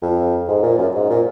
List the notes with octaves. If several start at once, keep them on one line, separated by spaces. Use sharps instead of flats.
F2
G#2
A#2
F#2
G#2
A#2